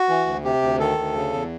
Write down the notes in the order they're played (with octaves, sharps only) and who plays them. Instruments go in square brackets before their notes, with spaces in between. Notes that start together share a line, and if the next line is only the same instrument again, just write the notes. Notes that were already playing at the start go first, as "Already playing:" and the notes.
Already playing: [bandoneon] F#4
E3
D2
C3 G4
D2
D#3 A4
D2
C#3
E2